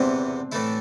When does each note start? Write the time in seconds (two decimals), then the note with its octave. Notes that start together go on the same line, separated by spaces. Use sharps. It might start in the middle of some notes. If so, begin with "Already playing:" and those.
Already playing: E2 C3 E3 B3 C4 D4
0.52 A2 E3 A3 E4